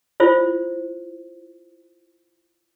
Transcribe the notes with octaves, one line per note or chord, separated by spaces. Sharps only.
E4 F4 C5